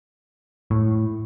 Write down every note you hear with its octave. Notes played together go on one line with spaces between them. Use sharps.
A2